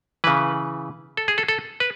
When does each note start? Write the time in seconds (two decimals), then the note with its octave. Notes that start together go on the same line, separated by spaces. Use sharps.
0.24 C#3 E3 B4
1.17 A4
1.28 G#4
1.38 A4
1.48 A4
1.80 B4